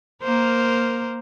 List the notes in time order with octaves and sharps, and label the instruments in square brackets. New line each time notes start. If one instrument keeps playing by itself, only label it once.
[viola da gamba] A#3 A#4 C5